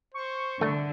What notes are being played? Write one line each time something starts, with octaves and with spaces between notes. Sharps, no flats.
C5 C#6
C2 D3 A3